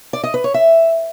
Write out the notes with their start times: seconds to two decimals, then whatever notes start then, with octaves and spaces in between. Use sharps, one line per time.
0.13 D5
0.24 D#5
0.34 B4
0.44 C#5
0.54 E5